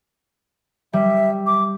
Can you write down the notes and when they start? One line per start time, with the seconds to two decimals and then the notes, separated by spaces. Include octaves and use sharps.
0.93 G3 E5
1.46 D6